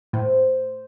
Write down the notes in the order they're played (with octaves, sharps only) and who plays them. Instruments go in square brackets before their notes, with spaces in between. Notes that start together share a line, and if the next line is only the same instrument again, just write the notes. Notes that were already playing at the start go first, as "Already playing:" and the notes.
[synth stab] A2 [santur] C5